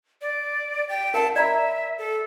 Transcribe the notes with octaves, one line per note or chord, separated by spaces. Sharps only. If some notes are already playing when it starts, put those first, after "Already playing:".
D5
G5
A#4 F5 G5 A5
D5 E5 A#5 B5
A4